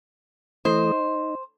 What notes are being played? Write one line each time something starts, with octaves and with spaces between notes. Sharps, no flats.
E3 A3 C5 D#5
D#4